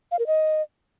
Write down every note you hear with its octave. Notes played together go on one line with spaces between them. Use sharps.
F5
A#4
D#5